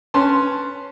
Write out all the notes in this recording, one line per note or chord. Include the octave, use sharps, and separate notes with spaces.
C#4 B4 A5 C6